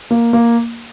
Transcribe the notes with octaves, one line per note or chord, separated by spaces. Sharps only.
A#3
A#3